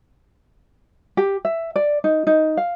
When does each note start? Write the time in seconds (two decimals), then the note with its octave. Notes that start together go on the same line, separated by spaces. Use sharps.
1.17 G4
1.45 E5
1.76 D5
2.04 D#4
2.27 D#4
2.57 F5